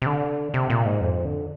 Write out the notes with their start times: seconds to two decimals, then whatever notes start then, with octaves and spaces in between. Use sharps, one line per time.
0.02 C3
0.06 D3
0.54 C3
0.70 A#2
0.85 G#2
1.01 F2
1.25 D3